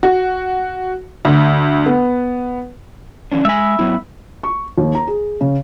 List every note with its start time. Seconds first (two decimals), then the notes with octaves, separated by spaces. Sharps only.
0.03 F#4
1.25 D2
1.86 B3
3.32 E3 C#4 D4
3.45 G#3 E5 G#5 B5
3.79 F#3 B3 E4
4.43 C#6
4.78 D#2
4.95 A#5
5.07 G#4
5.41 C#3